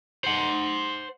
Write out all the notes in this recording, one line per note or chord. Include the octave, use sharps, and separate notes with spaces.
C5 F#5